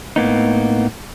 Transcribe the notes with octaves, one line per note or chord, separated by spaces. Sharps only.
A2 A#3 B3 D#4